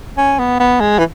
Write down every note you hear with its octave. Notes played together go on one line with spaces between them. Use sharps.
C#4
B3
B3
G#3
E3